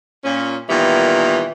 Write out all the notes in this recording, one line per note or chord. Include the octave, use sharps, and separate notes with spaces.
A#2 C#4
A#2 D#3 E3 G3 B3